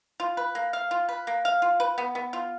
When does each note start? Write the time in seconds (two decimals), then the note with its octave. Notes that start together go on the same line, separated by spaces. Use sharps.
0.20 F4
0.37 B4
0.55 A#3
0.73 F5
0.91 F4
1.09 B4
1.27 A#3
1.45 F5
1.62 F4
1.80 B4
1.98 B3
2.15 B3
2.33 F4